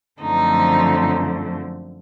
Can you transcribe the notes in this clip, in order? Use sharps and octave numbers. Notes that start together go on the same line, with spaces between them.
F#2 D3 F3 A3 C4 D#4